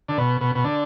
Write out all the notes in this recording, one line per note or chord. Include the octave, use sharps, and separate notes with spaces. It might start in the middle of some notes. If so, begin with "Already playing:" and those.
D3
B2
B2
B2
D3